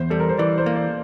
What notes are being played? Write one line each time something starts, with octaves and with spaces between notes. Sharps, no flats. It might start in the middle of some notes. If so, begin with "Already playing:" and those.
Already playing: E2 C5
G3 A4
A#4
C5
E3 D5
C5
A#3
D5